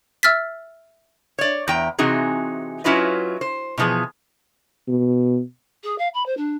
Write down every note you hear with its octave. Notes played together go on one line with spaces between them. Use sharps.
E5 E6 F6 A6 B6
C#5 D5
E2 G5 A#5
C3 E3 C4 D#4 F#4 G#4
F#3 C#4 E4 F4 B4 D#5
C5
B2 E3 F3 B3 G#4
B2
G#4
F5
B5
C5
D4